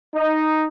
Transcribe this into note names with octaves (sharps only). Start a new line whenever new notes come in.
D#4